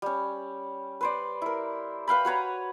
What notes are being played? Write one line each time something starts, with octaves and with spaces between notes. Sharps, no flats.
G3 C#4
B4 C5 D5
E4 A#4
B4 F5 G5 B5
F#4 B4 C#5 A#5